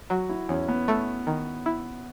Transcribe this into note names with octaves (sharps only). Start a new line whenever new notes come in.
F#3 F#4
E4
E2 C#4
B3
A3
D#3
E4